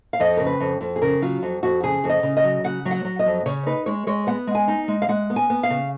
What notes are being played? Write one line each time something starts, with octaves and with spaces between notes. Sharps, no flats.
F5
F2 D#5
C#3 A#4
B4
F2
F2
G#4
C#3 A#4
F#3 F4
F2
F2 F#4
C#3 G#4
F2
D#5
C#3
D#5
F#3
C#3 F#5
F#3
F#5
F#3
D#5
F2
C#3 C#5
D#4 B4
G#3 C#5
G#3 C#5
B3 F#5
G#3
G#5
D#4
G#3
F5
G#3 F#5
B3
G#5
B3
F5
C#3